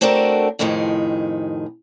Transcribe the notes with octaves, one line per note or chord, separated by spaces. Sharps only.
A3 C4 D4 F#4 A4 A#4
F2 A2 C3 D#3 G#4